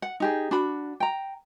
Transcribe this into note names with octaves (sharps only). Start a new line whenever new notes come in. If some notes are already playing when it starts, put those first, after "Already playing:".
F#5
D#4 G4 G#4
D4 F#4 B5
G5 A#5